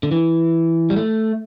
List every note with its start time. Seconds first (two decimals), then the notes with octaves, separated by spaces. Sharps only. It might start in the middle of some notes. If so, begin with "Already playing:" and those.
0.03 D3
0.11 E3
0.90 G3
0.96 A3